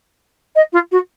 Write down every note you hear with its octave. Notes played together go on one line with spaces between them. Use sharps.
D#5
F4
F#4